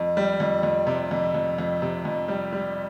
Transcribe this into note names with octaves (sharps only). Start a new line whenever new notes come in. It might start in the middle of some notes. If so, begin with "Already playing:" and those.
Already playing: F2
G3
F2
F2
C3
F2
F2
F2
C3
F2
G3
G3